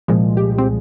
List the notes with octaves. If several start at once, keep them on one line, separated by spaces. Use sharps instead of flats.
C2 A#2 F3 G#3
G4
C4